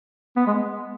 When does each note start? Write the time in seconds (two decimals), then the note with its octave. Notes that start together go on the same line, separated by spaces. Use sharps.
0.37 B3
0.47 G#3